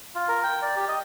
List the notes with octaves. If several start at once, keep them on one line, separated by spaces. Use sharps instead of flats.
F4
A#4
G5
D5
G4
D#5